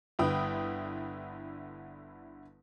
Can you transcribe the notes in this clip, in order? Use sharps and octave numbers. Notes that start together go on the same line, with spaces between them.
G1 D3 E4 B4 G5 D#6